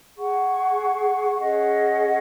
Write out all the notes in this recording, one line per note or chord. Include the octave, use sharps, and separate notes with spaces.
G#4 F#5 C#6
C#4 G#4 D#5 F#5